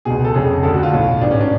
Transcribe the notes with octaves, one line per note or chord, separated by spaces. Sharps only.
C#2 B2 G#4
A4
F1 F2 C#3 G#4
D2 D3 A4
F#4
F4
B1 A2
A1 G#2 D4
C#4
D4